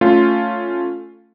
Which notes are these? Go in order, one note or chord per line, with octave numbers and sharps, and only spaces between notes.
A3 C#4 F4